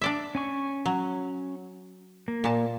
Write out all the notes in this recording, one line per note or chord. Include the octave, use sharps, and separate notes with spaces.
D4 D5 E5
C#4 G#5 C#6
F#3
A#3
A#2 A5